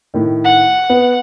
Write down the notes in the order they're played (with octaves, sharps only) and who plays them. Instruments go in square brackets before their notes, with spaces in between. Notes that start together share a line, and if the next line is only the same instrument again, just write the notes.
[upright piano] A2 D#3
[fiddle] F#5
[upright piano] B3